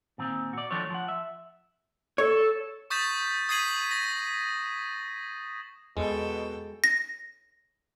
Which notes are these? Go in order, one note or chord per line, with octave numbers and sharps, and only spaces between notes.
A#2 D#3 C4
F#4 D5
D#3 F3 A3 D4 C#5
F3 F#5
E5
A4 C#5
C#6 D#6 G6 A6 B6 E7
D#6 G#6 B6 C7 D#7 F#7
A#6
E2 B2 G#3 A4 G5
A#6